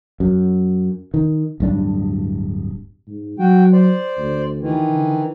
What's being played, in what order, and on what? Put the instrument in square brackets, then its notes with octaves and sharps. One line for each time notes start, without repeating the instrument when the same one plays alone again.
[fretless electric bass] F#2
D#3
D1 G2 D4
[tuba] G#2
[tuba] F#3 [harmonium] F#4 G5
[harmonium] C5 D5
[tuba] D2
[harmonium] D#3 E3
[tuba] D3